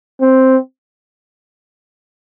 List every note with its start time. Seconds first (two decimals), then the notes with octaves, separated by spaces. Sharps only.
0.20 C4